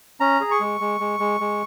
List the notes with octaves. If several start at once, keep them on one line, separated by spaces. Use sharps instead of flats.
C#4 A#5
G#4
C#6
G#3
G#3
G#3
G#3
G#3